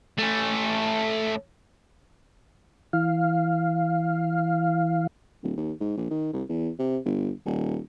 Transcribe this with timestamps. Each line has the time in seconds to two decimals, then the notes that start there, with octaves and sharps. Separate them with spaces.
0.18 A3 C#4
2.93 E3 F5
5.43 D1
5.58 D#2
5.81 G#2
5.97 A#1
6.10 D#3
6.33 C2
6.49 E2
6.79 C3
7.05 G1
7.46 D#1